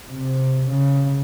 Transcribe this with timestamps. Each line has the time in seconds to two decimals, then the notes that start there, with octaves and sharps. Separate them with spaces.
0.12 C3
0.72 C#3